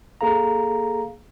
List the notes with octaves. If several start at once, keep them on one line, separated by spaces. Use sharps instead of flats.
A#3 G#4 A4 F5 A#5